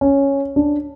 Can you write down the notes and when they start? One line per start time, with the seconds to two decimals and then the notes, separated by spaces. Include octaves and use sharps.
0.01 C#4
0.56 D4